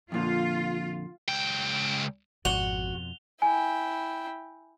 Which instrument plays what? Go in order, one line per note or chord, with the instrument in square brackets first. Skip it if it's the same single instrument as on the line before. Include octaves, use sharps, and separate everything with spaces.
[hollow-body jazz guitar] F2 A#2 D3 [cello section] F4
[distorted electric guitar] C#2 G5
[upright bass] G#1 [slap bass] F2 B2 F3 [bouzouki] F#4 [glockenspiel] F7 G7
[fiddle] E4 G5 [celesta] G#5